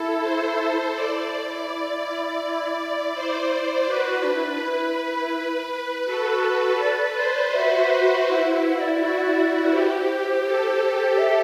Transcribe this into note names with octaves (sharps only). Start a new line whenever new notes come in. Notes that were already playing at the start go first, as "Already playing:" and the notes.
Already playing: E4 A4
C5
E4 D5
C5
C5
F#4 B4
D4
E4
D4
E4
F#4 A4
B4 D5
C5
F#4 E5
E4 E5
F#5
F#5
D5
F#4
B4
G4 C5
A4
E5